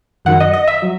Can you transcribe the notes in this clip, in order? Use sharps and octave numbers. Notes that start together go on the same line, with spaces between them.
F#2 D#3 F#3 F#5
D#5
D#5
E5
F#3